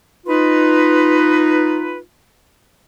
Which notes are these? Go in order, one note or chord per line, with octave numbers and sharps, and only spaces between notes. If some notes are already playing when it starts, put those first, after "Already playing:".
D#4 F4 B4